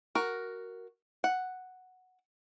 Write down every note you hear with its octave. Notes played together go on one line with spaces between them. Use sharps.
F#4 A#4
F#5